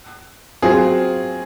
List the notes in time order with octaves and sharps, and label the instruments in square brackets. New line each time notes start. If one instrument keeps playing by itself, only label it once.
[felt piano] F#3 C4 F4 [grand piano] G#4